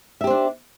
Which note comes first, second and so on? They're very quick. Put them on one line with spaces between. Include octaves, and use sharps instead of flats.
E5 G4 C5 D4